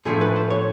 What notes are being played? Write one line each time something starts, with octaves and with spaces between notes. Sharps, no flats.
A2 F3 A3 D4 G#4
B4
C5
C#5